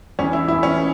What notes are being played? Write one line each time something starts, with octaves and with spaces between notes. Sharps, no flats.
E2 E3 C#4
E4
E2 E3 E4
C#4
E3